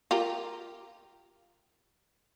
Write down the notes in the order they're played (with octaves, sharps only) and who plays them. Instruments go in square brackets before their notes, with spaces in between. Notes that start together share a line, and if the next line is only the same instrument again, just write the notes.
[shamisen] F4 G4 A#4